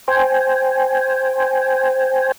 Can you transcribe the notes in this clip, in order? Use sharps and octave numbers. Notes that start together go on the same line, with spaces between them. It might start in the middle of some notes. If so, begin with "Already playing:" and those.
C5 G5 G#5